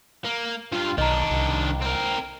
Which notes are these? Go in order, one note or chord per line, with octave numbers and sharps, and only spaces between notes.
A#3
G2 F4 F5
B1 D#3 D4 D#5 A#5
C2
C4 A#4